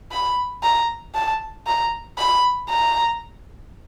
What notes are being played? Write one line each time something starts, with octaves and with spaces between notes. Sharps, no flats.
B5
A#5
A5
A#5
B5
A#5